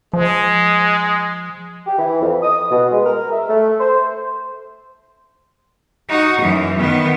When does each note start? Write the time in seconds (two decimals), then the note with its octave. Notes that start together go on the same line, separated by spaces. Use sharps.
0.13 F3 G#3
1.87 G4
1.99 E3
2.21 F2
2.43 D#6
2.71 B2
2.91 G#3
3.06 A#4
3.32 E5
3.49 A3
3.80 C5
6.09 D#4 F#4
6.41 F#2 E3
6.78 D#3 B3